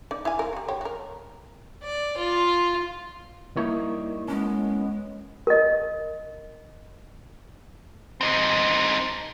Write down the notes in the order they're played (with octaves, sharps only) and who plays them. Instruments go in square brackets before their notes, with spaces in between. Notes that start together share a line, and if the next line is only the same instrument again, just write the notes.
[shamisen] D#4 D5
E4 F5 G#5
C4 A#4
G3 F#4
D3 G4 C#5
F#4 A#4
[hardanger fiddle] D5
F4
[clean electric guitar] G3 D#4 C#5 [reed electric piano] A#3 E4 A#4
[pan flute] G#3 [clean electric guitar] B3 C#4
[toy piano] A#4 D#5
[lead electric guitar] C4 D#4